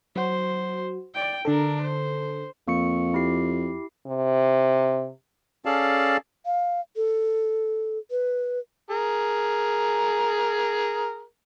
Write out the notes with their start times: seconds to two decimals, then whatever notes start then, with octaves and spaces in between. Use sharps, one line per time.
0.16 F#3 F#4 C5
1.14 D5 G5
1.45 D3 D4 A4 A#4
1.81 C5
2.68 F2 A#3 C#6 C#7
3.14 E4 G4 C7
4.07 C3
5.65 C#4 G#4 A4 D5 F5 A5
6.46 F5
6.96 A4
8.11 B4
8.90 G#4 A#4